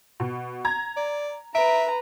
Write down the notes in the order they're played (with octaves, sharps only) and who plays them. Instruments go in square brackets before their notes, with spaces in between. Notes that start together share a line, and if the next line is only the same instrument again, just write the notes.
[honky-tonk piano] B2
A#5 G#6
[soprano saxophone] D5
[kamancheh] B4 A#5 [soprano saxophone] E5 [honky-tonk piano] D7